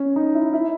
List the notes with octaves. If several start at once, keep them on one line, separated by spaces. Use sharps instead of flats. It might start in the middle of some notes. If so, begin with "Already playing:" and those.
Already playing: C#4
D#4
E4
E4